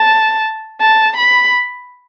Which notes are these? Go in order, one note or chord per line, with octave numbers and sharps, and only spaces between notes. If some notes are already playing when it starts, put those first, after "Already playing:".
Already playing: A5
A5
B5